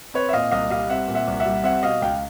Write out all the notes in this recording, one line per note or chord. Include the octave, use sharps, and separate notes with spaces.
C4 B4 C#5
E5
A#2 D#5 F5
C2 D#5 F5
G3 D#5 F5
C4 E5 F#5
A#2
E5 F#5
C2
E5 F#5
G3
C4 E5 F#5
B2 D#5 F5
C#2 F5 G5